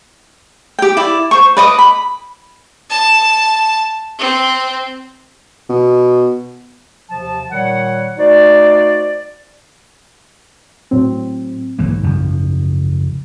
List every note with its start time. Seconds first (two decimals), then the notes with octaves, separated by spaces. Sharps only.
0.79 G4 G5
0.97 E4 D5
1.31 C5 C#6
1.57 B4 D5 D#5 D6
1.79 B5
2.90 A5
4.19 C4
5.69 B2
7.10 D#2 C3 F3 A5
7.50 A#2 D#3 G3 C#5 F#5
8.18 A3 D#4 F#4 C5 D5
10.91 A2 F#3 C4
11.79 B1 G#2 D#3 E3 A#3
12.03 F#2 C#3 F3